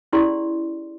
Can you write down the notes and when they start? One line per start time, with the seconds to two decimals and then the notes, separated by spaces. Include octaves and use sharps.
0.13 C#4 E4 G4 G#4 D5 C6